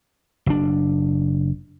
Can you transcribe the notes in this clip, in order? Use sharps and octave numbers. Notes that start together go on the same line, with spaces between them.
F#1 D4